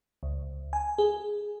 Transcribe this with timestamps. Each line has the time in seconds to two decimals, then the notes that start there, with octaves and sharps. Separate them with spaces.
0.23 C#2
0.73 G#5
0.98 G#4